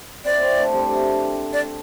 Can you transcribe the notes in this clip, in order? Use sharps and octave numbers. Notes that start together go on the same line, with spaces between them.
C4 E4 D5
C4 E4
A3 D4
G3 C4
A3 D4
D5